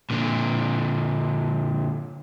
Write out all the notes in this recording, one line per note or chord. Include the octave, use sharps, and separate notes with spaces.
A#2 D3